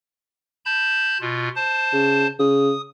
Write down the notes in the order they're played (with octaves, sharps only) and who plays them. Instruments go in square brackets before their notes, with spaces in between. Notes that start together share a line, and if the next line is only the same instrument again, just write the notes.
[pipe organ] A5 B5 G6
B2 F4
C5 A5
[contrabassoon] C#3
[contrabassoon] C#3 [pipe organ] D#6